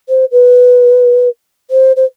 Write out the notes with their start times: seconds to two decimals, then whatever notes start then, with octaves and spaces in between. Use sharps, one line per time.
0.09 C5
0.32 B4
1.70 C5
1.96 C5